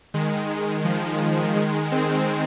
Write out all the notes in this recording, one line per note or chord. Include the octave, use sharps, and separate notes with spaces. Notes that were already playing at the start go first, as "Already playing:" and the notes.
D#3 G#3
F3
D#3 G#3
G#3 C4